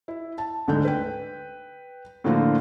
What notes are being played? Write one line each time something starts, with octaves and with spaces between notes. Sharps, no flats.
E4
A5
D2 G#2 D3 G6
B4 G5
A2 D3 F3 A#3 F4 F#4